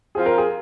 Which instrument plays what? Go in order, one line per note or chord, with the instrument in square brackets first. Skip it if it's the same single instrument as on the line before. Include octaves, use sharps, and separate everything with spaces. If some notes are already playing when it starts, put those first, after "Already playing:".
[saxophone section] F3 C4 F4 [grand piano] G#4
[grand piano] A#4
G#4